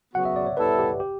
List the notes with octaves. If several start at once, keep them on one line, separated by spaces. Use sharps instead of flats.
C#3 F#3 B3 F#4 F#5
E5
D5
C#5
G3 B3 E4 A4 B4
G4
G4